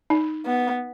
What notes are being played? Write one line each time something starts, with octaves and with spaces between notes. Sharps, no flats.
D#4
B3